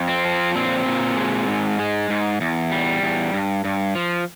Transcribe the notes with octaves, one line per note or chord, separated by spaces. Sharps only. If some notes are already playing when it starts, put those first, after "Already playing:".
Already playing: F2
C4
F3
A#2 C4
A#2
G#3
G#2
G#3
G#2
E2
G3
E2
G2
G2
F3